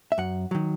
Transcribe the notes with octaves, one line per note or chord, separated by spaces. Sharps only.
E5
F#2 F#5
D#3 F#3